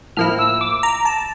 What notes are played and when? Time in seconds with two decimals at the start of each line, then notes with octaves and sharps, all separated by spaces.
0.17 A2 F3 A#3 E4 F6
0.39 E6
0.61 D6
0.83 A#5
1.05 A5